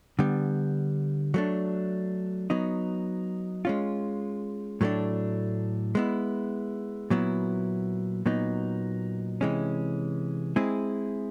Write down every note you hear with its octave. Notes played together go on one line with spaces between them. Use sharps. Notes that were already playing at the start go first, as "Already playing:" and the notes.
D3 G3 B3
F#3 A3 D4
F#3 B3 D#4
G#3 C#4 F4
A2 F#3 A3 D4
G#3 B3 E4
A#2 F#3 B3 E4
A#2 F#3 B3 D#4
C3 E3 G#3 C#4
G#3 C4 E4 G#4